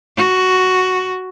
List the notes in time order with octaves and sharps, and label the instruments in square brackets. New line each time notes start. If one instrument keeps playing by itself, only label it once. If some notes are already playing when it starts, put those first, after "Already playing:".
[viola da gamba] F#4